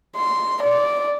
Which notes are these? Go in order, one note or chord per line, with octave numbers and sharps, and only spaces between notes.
C6
D5